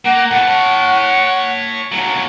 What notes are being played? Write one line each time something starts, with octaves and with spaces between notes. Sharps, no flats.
A#3 F#5
A2 B3 F#5
C#5 A5
D#2 F#3